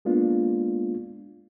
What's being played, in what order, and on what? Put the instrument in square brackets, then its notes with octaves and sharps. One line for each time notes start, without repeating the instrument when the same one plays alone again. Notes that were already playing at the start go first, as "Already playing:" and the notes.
[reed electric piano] G#3 A#3 B3 D4 F4